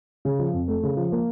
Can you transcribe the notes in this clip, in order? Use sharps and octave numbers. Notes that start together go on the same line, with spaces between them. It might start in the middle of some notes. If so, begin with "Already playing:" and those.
C#3
F3
F2
A3
C#3
F3
A#3